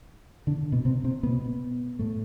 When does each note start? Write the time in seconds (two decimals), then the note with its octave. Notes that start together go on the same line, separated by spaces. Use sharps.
0.47 D3 D4
0.72 B2 B3
0.85 C3 C4
1.04 C3 C4
1.23 B2 B3
1.99 A2 A3